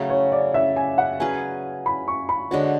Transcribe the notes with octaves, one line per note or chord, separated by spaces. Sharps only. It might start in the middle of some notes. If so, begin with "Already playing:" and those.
Already playing: C#3 F#3 A3
C#5
D5
E5
G#5
F#5
F#3 C#4 G#4 B4 G#5
B5
C#6
B5
D3 G#3 D4 F#4 C#5